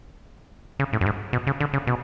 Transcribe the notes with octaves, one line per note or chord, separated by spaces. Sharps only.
C#3
A2
F#2
G#2
B2
C#3
D3
C#3
B2